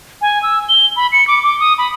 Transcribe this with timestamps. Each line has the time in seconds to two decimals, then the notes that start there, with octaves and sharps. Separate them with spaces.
0.22 G#5
0.42 E6
0.69 G7
0.96 B5
1.12 C#7
1.27 D6
1.43 D6
1.60 D#6
1.78 B5